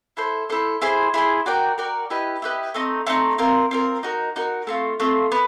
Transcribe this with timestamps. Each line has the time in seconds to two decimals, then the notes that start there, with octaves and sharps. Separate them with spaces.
0.17 E4 A4 C5
0.50 E4 A4 C5
0.82 E4 G#4 C5
1.14 E4 G#4 C5
1.46 F#4 A#4 D5 G5
1.78 F#4 A#4 D5 G5
2.10 E4 G4 B4 D#5
2.42 E4 G4 B4 D#5
2.74 A3 C4 D#4
3.07 A3 C4 D#4
3.38 C4 F4 A#4
3.71 C4 F4 A#4
4.03 D#4 F#4 A#4
4.36 D#4 F#4 A#4
4.67 A3 C4 F4
5.00 A3 C4 F4
5.32 B3